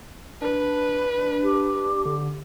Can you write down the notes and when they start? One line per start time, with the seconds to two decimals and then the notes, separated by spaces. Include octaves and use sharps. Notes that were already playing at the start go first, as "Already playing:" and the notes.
0.42 D4 B4
1.43 G4
2.05 D3